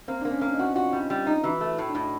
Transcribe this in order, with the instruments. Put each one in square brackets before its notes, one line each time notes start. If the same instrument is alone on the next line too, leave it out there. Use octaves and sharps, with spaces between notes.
[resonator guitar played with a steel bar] A#3 [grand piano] C4
[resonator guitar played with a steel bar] A#3 [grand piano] D4
[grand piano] C#4
[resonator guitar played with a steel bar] A#3
[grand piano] D4
D#4
[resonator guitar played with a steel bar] F#4
[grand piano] F4 [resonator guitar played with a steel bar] F#4
[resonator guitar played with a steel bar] G3
[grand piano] D#4
[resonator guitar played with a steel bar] G3
D#4
[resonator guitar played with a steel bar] E3 [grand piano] F#4
[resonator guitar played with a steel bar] A3
[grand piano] E4
[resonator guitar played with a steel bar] A2
[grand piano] D4
[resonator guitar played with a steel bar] A2 [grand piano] D#4